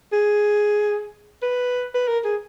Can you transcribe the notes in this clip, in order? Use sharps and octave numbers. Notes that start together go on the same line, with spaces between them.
G#4
B4
B4
A#4
G#4